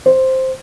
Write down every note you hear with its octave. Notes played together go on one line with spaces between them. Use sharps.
C5